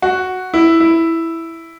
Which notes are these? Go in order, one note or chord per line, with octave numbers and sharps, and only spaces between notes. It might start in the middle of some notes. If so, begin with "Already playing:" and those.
F#4
E4
E4